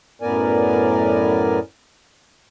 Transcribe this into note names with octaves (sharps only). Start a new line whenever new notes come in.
F#2 A2 B3 A#4 D5 G#5